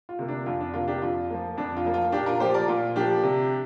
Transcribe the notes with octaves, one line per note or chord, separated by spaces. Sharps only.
F4
C3 A#3
D4
F2 F4
D4
C3 A#3 F4
D4 G4
F2 F4
F3 A#3
F2 D4
F4
F3 A#3
F4
A#2 D4 G4
F4 A#4
F3 A#3 G4 C5
A#4 D5
A#2 F4
F3 A#3 D4 G4
C3